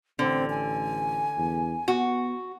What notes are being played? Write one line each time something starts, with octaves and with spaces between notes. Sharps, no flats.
A1 D3 C4
G#5
E2
B3 F#4